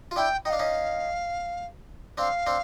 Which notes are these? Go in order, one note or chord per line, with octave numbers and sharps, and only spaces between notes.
F4
D4 E4 G5
D#4 G5
D4 F5
C#4 D#4
C4 D4 F5
C4 D4